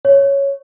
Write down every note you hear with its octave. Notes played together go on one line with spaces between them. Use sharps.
C#5